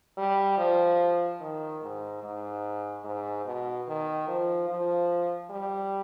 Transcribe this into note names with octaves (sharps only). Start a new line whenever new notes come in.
G3
F3
D#3
G#2
G#2
G#2
B2
D#3
F3
F3
G3